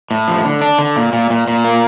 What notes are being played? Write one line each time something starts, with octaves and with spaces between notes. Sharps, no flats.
A2
F3
D3
D4
D3
A#2
A#2
A#2
A#2
A#3